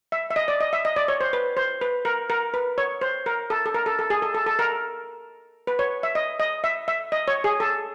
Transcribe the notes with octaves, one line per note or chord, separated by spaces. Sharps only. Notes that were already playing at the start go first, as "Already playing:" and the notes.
E5
E5
D#5
D5
D#5
E5
D#5
D5
C#5
C5
B4
C5
B4
A#4
A#4
B4
C#5
C5
A#4
A4
A4
A#4
A4
A4
G#4
A4
A4
A4
A#4
B4
C#5
E5
D#5
D#5
E5
E5
D#5
C#5
G#4
A4